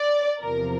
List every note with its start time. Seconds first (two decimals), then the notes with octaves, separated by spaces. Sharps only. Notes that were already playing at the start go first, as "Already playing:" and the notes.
Already playing: D5
0.41 E2 C3 F3 A#4